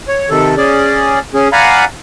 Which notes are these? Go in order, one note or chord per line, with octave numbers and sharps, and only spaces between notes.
C#5
C3 D#3 A4
C#4 G#4 D5
C#4 G#4
D5 F5 F#5 G#5 A#5 B5